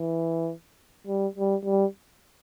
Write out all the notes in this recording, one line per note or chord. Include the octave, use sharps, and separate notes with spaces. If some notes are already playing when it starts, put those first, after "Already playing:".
Already playing: E3
G3
G3
G3